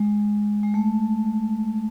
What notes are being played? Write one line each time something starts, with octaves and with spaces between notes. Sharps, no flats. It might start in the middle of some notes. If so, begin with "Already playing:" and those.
Already playing: G#3
G#3
A3